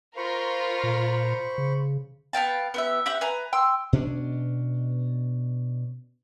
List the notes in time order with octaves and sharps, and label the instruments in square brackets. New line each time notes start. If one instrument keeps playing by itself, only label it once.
[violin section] F4 A#4 [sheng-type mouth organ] C5 B5 C#6
[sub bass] A#2
C#3
[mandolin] B3 F5 G5 A5
B3 G4 E5
G4 E5 F#5 G6
B4 G#5 A#5
G5 C6 E6
[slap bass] B2 C#4 D4